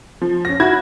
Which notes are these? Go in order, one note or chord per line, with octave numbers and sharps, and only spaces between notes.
F3
C#4 A#6
E4 F#4 B5 G#6